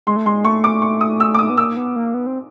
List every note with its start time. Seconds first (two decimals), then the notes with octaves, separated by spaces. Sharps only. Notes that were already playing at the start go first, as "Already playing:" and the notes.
0.07 G#3 C6
0.16 A3
0.26 G#3 C6
0.44 A3 C#6
0.64 D6
0.82 C#6
1.01 D#6
1.20 E6
1.34 D6
1.39 D#6
1.50 B3
1.57 A#3 E6
1.77 B3
1.96 A#3
2.14 B3
2.27 C4